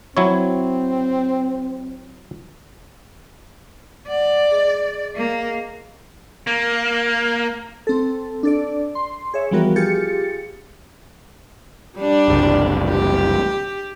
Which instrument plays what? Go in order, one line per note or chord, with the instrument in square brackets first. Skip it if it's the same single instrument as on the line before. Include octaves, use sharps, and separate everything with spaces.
[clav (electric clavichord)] F#3 E4 C#5 [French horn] C4
[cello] D5 [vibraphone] F#5
[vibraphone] G#4 D#5
[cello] A#3
[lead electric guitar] A#3
[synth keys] C4 A4
D4 A4 D5
C6
G#4 C#5 E5
E3 F3 G3 B3 F#4 A#4
F4 G4 G#4 A6 C#7
[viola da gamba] G3 D4 D5
[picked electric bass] F#1 C2
[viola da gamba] G4